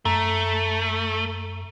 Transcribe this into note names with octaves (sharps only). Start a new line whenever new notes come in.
F#2 A3 A#5